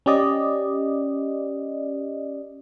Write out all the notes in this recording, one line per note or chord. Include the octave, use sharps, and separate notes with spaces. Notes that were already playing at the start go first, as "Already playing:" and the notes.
C#4 G4 D5 D#5